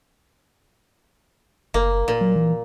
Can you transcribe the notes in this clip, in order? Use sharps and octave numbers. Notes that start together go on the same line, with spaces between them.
F#1 A#3
A#2
F#3
E3